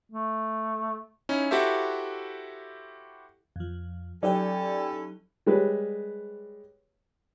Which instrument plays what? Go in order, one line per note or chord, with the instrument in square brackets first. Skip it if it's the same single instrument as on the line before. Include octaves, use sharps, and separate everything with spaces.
[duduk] A3
[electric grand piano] C#4 D#4 E4
E4 F#4 G4 A4 C5 E5
[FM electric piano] F2 F3
[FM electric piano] F#3 D#4 G4 [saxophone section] C#4 E4 A4 [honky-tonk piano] D5 G5
[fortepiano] G3 G#3 B4 C#5